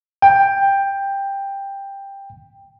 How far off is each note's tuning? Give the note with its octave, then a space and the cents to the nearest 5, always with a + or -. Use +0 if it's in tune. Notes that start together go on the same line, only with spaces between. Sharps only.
G5 +10